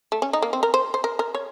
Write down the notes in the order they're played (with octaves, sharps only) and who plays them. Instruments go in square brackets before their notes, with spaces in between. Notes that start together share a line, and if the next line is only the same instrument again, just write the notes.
[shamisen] A3
C#4
D#4
A#3
C4
A#4
C5
C5
A#4
A#4
C#5